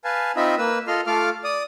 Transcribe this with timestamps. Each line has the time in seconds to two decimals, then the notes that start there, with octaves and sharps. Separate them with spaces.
0.04 B4 F5 G#5 A5
0.36 C4 D#4 F4 D#5 E5 B5
0.58 A#3 B4 E6
0.87 F4 A4 D#5 C6 F6
1.07 A3 F4 A4 F5 D6 F6
1.44 D5 D#6